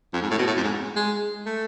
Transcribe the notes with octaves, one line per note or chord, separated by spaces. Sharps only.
F2
G#2
A2
B2
A2
F2
G#2
G#3
A3